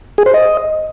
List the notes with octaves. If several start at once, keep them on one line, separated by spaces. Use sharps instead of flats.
G#4
C5
D#5